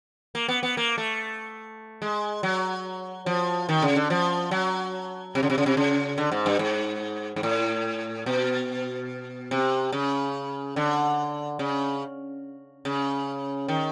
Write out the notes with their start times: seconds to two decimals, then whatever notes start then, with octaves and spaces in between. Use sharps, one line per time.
0.35 A#3
0.48 B3
0.63 B3
0.77 A#3
0.98 A3
2.02 G#3
2.43 F#3
3.26 F3
3.69 D#3
3.82 C#3
3.96 D3
4.10 F3
4.51 F#3
5.35 C3
5.43 C#3
5.50 C3
5.58 C#3
5.66 C3
5.77 C#3
6.18 D3
6.32 G#2
6.46 G2
6.59 G#2
7.36 G#2
7.43 A2
8.26 B2
9.51 C3
9.92 C#3
10.76 D3
11.59 C#3
12.85 C#3
13.68 D#3